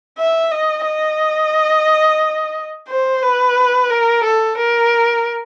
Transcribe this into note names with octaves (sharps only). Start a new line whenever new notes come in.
E5
D#5
D#5
C5
B4
A#4
A4
A#4